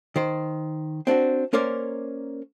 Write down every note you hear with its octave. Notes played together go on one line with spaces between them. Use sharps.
D#3 C5
C4 D4 F4 F#4
A#3 C#4 A#4 C5 D5